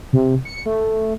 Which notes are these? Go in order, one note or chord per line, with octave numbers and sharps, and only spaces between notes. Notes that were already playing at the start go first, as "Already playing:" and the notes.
C3
C#7
A3